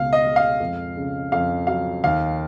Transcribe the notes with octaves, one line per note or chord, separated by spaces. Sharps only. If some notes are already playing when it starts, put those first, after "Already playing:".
Already playing: C#2 B2 B3 F5
D#5
G#3
F5
F2
C#3
F2 F5
F#3 F5
D#2 F5